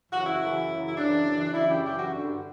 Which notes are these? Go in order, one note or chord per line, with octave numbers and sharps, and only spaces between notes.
F#2 C#3 E3 F#4
E4
F#2 C#3 E3
F#2 C#3 E3
E4
F#2 C#3 E3 D4
F#2 C#3 E3
F#2 C#3 E3 E4
G4
F#2 C#3 E3 G4
F#4
G2 D3